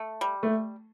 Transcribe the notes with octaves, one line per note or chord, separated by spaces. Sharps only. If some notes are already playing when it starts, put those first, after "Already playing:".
Already playing: A3
G3
A3